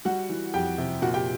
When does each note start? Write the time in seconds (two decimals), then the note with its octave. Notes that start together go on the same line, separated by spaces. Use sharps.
0.05 G3 F#4 F#5
0.30 E3
0.54 F2 G4 G5
0.78 C3
1.02 A#2 F#4 F#5
1.14 G4 G5